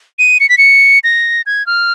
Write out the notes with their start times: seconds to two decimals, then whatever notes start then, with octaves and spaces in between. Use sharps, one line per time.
0.19 D#7
0.40 C#7
0.49 B6
0.58 C#7
1.04 A#6
1.46 G#6
1.67 F6